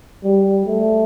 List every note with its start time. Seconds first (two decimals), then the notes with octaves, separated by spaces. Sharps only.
0.24 G3
0.66 A3